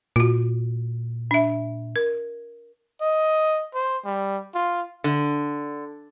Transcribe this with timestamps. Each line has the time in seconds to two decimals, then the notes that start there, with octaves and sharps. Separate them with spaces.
0.16 A#2 F4 F#4
1.31 D4 E5
1.96 A#4
3.01 D#5
3.74 C5
4.05 G3
4.54 F4
5.04 D3